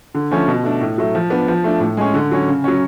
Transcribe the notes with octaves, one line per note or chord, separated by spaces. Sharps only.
D3
F3 A3 C#4
B2
A3 D4
A2
F#3 A3
F3
B3 D4
F3
A3 D4
A2
G#3 C#4
D3
F#3 C#4
C#3
F#3 C#4